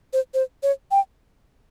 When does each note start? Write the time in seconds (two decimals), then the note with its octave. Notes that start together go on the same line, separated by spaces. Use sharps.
0.13 C5
0.34 C5
0.63 C#5
0.91 G5